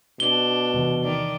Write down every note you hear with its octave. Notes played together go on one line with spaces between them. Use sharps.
B2 D4 G7
E2 C3 E3
D#3 D5